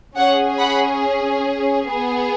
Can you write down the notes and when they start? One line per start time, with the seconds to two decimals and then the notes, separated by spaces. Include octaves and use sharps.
0.16 C#4 G#4 C#5 F#5
0.59 F#5 B5
1.89 B3 G#4